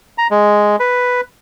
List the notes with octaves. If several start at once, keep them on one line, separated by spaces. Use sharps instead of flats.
A#5
G#3
B4